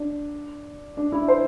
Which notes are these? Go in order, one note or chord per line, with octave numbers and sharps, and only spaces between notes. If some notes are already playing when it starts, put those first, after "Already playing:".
Already playing: D4
D4
E4
C5